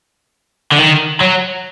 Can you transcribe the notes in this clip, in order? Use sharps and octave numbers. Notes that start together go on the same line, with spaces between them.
D3
D#3
F#3